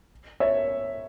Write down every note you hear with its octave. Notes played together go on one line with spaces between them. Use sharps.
C#5 E5